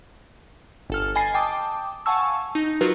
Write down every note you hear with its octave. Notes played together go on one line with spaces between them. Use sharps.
G1 A4 F6
D#5 G#5 B5 A6 C7
G5 A5 D6 D#6
F5 F#5 G#5 A5 C#6 E6
D#4
F#3 F4 F#4 A#4 B4